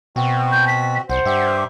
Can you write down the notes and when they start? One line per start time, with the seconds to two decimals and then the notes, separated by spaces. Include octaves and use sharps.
0.16 B2 C4 F#4
0.52 G6
0.68 B6
1.09 C2 C5 F#5
1.25 G2 G4 E5